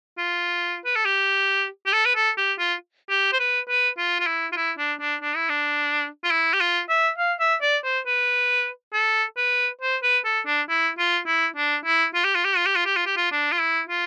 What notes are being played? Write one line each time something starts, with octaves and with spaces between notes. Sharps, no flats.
F4
B4
A4
G4
G4
A4
B4
A4
G4
F4
G4
C5
B4
B4
F4
F4
E4
F4
E4
D4
D4
D4
E4
D4
F4
E4
G4
F4
E5
F5
E5
D5
C5
B4
A4
B4
C5
B4
A4
D4
E4
F4
E4
D4
E4
F4
G4
F4
G4
F4
G4
F4
G4
F4
G4
F4
D4
F4
E4
F4